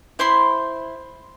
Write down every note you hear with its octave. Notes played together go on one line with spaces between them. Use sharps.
E4 C5 B5 C6